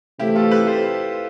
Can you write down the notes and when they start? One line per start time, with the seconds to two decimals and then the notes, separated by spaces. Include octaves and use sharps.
0.19 C3 E3 A3 E4 G4
0.35 F4 A4
0.51 G4 B4
0.67 A4 C5